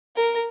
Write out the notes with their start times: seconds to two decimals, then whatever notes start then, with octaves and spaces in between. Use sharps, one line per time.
0.16 A#4